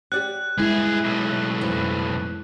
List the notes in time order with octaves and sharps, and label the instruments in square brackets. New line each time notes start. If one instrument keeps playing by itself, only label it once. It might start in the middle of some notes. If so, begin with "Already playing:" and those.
[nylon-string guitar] G4 D5 F#5 [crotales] F#6
[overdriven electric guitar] G2 G#4 [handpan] G#3 E4
[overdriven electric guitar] B1 A2
[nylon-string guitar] F2 E3